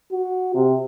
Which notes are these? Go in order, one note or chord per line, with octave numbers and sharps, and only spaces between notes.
F#4
C3